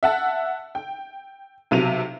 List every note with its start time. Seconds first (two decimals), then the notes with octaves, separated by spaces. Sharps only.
0.03 E5 F#5 A5
0.75 G5
1.71 B1 C3 F#3 D#7 F7